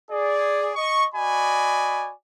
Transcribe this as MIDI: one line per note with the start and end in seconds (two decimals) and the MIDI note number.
0.11 0.71 68
0.11 0.71 74
0.76 1.06 75
0.76 1.06 85
1.15 2.12 66
1.15 2.12 74
1.15 2.12 75
1.15 2.12 80
1.15 2.12 83